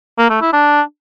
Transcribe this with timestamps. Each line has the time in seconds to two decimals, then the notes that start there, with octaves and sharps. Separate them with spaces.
0.18 A#3
0.30 A3
0.41 E4
0.53 D4